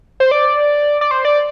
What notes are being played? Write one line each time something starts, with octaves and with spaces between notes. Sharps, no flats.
C5
D5
D5
C5
D5